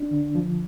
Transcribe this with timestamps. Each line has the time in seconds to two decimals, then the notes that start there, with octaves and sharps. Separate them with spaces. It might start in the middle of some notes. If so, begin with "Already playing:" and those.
Already playing: D4
0.11 D3
0.35 F3